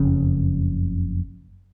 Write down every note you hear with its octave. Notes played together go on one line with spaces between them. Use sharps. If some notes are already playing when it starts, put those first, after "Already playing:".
Already playing: F#1 F2 C#3 C#4